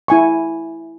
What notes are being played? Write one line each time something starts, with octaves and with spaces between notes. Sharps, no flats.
E4 G#5 C#6